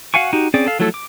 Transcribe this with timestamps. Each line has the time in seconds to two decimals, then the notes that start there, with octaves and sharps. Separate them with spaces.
0.14 F#4 F5 F#5 G#5 C#6
0.33 D#4 F#4 G4
0.54 C4 C#4 G#4 D5
0.67 A4 F5
0.79 F3 F#3 A3 E4 A4
0.94 D6